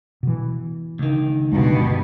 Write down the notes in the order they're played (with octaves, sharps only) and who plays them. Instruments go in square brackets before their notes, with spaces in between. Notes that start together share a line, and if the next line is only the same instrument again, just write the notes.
[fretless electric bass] B2 E3
[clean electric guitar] C#2 D#3
[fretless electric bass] D2 G#3 [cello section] G2 B2